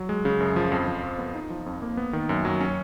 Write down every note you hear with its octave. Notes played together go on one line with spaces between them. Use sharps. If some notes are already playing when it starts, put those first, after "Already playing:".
Already playing: F#3
G#3
C#3
F#2
F3
F2
F3
F2
B3
D#4
F3
F2
A#3
B3
D#3
F#2
F#3
C#4